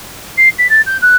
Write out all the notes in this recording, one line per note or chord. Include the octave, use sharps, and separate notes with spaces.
C7
B6
A6
G6
F#6